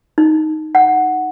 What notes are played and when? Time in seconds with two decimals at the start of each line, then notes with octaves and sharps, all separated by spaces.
0.18 D#4
0.75 F#5